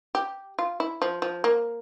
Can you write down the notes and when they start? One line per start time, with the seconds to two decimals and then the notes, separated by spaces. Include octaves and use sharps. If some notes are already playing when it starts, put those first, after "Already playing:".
0.15 G4
0.59 F4
0.80 E4
1.02 F3
1.22 F3
1.44 A#3